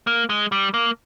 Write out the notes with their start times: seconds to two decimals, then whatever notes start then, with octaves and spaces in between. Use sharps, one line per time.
0.07 A#3
0.30 G#3
0.52 G3
0.74 A#3